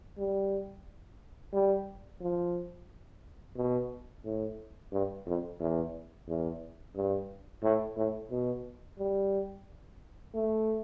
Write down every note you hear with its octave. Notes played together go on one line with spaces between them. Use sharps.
G3
G3
F3
B2
A2
G2
F2
E2
E2
G2
A2
A2
B2
G3
A3